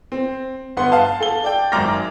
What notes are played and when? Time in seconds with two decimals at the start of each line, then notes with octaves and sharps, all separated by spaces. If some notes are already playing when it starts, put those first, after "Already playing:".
0.12 C4
0.77 G1 B3 F#5 C6
0.92 F5 A5
1.20 A4 G7
1.44 D5 G5
1.72 G#1 F#2 A#5 D6 F6 A#6